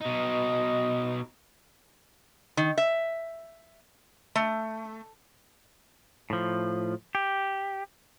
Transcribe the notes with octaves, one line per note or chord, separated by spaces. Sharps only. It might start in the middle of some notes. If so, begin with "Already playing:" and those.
B2 D#4 D#5
D#3
E5
A3
A2 F3
G4